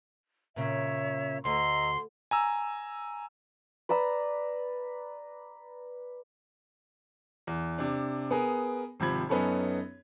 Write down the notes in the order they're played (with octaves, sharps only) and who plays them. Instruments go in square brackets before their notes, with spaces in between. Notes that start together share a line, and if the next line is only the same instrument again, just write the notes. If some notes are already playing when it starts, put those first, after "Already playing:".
[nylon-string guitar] A#2 C#3 [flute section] C#5 E5
[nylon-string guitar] D2 [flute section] D#5 A#5 E6 [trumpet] C6
[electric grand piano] G#5 A#5 E6
[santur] B4 D5 A#5 E6
[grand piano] E2
C3 D4
B3 G#4 A#4
G#1 C3 F3 B5 G#6
F#2 B3 C#4 D#4 A4 B5